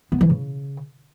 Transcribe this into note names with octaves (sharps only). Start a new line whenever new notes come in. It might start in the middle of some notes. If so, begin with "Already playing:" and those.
B3
E3
C#3